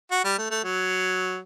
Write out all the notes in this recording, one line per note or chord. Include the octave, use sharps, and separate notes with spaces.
F#4
G3
A3
A3
F#3